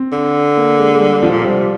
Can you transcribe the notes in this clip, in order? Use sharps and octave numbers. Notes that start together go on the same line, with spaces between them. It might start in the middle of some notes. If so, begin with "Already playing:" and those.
Already playing: C4
D3
A#3
G#3
G#3
G3
F3
A#2
C3 G3